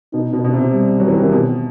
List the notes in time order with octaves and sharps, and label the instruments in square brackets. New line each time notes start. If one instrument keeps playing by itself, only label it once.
[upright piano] B2 [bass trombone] D#4
[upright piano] B2
B2
C3
[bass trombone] G3
[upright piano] F#3
E3
D#3
C3
B2